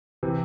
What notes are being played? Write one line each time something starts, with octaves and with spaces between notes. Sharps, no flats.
C3 E3